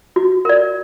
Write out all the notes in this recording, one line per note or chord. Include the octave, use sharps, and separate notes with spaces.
F#4
A#4 D5